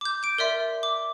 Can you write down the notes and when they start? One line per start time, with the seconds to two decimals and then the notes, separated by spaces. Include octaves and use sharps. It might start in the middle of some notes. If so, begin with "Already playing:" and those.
0.01 D6 G6
0.23 G6 D7
0.38 A#4 D5 E5 C6
0.83 D6